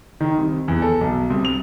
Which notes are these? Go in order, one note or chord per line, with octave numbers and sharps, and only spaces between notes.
D#3
C2
E2
A4
B1
C2
F7